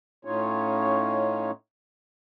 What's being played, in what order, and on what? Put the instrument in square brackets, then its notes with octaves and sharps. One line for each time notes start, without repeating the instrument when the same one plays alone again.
[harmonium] A2 C#4 D#4 F4 C#5